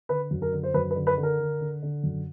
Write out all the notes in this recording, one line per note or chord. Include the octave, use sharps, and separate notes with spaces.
D3 B4
F#2
A#4
D3
C5
F#2 B4
B4
D3
B4
D3
A#4
D3
D3
D3
F#2